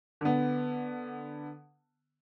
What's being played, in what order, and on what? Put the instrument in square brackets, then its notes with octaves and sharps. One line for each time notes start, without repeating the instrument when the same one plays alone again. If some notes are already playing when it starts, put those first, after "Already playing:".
[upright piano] D3 B3